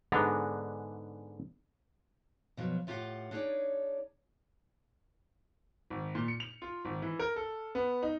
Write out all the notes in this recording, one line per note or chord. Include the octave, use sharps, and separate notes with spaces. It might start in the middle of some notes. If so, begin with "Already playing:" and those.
G#2 D3 G#3 B3 D4 A#5
B2 F3 F#3
A2 F4 G4 C5 F5 F#5
D4 D#4 G#4 C#5 D5
G#1
A#2
C#7
F7
F4
G#1
E3
A#4
A4
B3
D#4